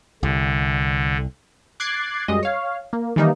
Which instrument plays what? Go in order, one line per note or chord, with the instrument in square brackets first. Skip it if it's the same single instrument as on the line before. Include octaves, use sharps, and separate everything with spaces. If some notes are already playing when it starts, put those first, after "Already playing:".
[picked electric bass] C2 [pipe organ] D3
[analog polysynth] D6 F#6 G#6 A6 C7
F#2 G3 G#3 D#5
C#5 F5
A#3
D#3 E3 G3 A#3 D#4